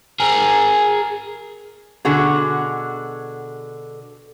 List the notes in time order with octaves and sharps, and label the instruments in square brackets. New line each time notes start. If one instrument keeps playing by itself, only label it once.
[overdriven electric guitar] G#4 A#4
[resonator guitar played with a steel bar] B2 D3 F#4 G#4